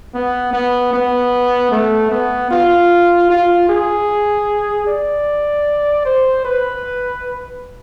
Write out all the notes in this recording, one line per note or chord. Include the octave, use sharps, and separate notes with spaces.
B3
B3
B3
A3
B3
F4
F4
G#4
D5
C5
B4